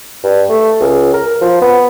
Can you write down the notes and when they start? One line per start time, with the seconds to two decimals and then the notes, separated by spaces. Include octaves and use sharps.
0.24 G2
0.49 A3
0.81 C#2
1.14 A#4
1.41 F3
1.61 B3